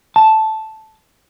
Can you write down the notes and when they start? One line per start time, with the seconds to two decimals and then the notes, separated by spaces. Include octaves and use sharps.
0.16 A5